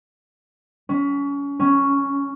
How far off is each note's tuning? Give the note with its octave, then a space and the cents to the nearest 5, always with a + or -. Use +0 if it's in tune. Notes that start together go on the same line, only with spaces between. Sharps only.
C#4 +30
C#4 +5